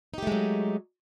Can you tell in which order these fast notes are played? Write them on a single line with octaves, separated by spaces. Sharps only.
D#4 G4 A3 G#3 F#3